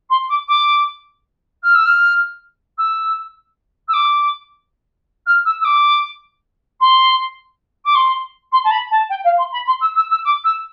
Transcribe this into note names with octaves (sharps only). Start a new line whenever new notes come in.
C6
D6
D6
F6
E6
F6
E6
E6
D6
F6
E6
E6
D6
C6
D6
C6
C6
A5
B5
A5
G5
F5
C6
B5
C6
E6
E6
E6
D6
E6